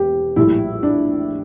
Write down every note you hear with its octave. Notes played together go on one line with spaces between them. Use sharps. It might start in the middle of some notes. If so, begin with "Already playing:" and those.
Already playing: E1 G4
A#1 A2 G3 E4
D4